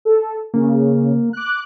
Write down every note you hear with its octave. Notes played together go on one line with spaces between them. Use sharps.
A4
C#3 A#3
D6 F#6